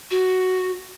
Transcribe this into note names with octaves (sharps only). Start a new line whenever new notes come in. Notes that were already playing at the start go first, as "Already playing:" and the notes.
F#4